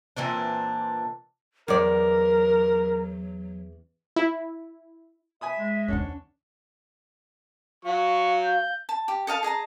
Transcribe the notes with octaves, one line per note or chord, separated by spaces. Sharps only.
A#2 E3 C4 D4
E2 F#3 A#4 D5
E4
E5 G#5 B5 D#6
G#3
E2 D#3 C#4 D4 F#5
F#3 F5 C#6
G6
A5
G4
A4 D#5 F5 A5
G#4 D#5 A5 A#5